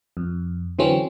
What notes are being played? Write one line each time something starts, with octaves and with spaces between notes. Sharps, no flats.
F2
D3 E3 F#3 C4 C#4